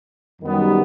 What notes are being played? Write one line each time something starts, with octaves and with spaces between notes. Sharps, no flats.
F#2 D#3 G3 B3